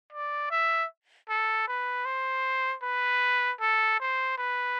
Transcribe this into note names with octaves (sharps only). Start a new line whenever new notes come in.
D5
E5
A4
B4
C5
B4
A4
C5
B4